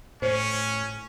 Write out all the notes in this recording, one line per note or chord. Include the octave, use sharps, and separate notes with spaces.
A2 C#4 C5